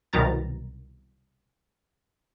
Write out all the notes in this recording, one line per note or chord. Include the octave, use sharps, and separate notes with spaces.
C2 B2 D#3 F#3 A#5 A6